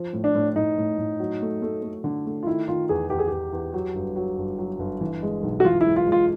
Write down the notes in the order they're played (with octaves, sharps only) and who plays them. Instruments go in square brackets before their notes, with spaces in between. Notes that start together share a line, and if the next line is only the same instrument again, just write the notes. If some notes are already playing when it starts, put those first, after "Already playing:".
Already playing: [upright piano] F3
A2
[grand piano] D4
[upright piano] A2
[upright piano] A2 [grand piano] D#4
[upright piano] A2
A2
F#3
A3
A3
A3
D3
A3
[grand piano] F4
[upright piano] D#3 [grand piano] E4
[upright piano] D#3 [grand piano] F4
[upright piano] E2 [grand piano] G#4
[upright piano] E2 [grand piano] G4
[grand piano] G#4
[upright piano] E2 [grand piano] G4
[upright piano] E2
F#3
G1
F#3
G1
F#3
G1
E3
G#3
B1
[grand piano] F#4
[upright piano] E3 [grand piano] F4
[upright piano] G#3 [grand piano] E4
[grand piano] F4
[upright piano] G#3
[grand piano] F4